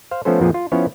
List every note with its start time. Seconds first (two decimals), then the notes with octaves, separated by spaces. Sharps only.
0.11 C5 F5
0.25 F3 A3 B3 C#4 A4 C5
0.40 F2 A#2 F3 B3 G#4
0.54 F4
0.72 F3 B3 C#4 E4 C#5